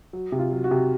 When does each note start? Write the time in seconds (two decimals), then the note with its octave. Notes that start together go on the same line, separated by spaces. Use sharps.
0.13 F#3
0.32 C3
0.39 F4
0.52 F#3
0.64 F#4
0.71 C3